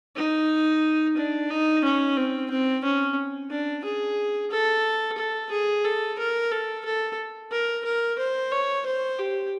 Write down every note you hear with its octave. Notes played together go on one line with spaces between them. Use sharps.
D#4
D4
D#4
C#4
C4
C4
C#4
D4
G#4
A4
A4
G#4
A4
A#4
A4
A4
A#4
A#4
C5
C#5
C5
G4